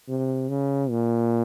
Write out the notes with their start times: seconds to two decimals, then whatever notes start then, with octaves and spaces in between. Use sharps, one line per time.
0.09 C3
0.49 C#3
0.90 A#2